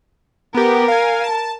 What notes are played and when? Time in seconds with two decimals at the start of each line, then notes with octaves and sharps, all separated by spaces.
0.55 B3 G4 A#4
0.88 F5 G#5
1.24 A5